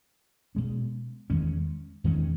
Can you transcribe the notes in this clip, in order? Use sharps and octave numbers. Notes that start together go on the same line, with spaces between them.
B2 G#3 C#4
E2 D#3 G#3 C#4
E2 D#3 G#3 C#4